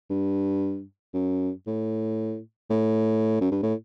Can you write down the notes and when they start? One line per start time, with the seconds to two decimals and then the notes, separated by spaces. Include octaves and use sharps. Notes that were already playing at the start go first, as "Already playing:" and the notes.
0.10 G2
1.14 F#2
1.67 A2
2.70 A2
3.41 F#2
3.51 G2
3.63 A2